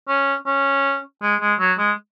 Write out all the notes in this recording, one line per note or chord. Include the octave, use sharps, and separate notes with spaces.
C#4
C#4
G#3
G#3
F#3
G#3